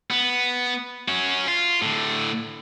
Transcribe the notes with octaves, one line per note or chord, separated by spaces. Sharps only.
B3
C#4 F#4
F4
A2 D3